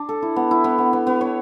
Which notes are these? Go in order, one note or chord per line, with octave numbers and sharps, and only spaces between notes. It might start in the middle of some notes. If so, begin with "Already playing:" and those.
Already playing: D4
A4
E4
B3
E4
B3
B3
B3
B3
C#5